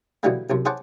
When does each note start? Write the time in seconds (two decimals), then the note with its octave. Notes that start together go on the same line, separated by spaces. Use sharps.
0.23 B2 D3 E3 F#3 G3 A#3
0.50 C2 F#2 C3
0.65 G#4 C5 C#5 F#5 A5 D6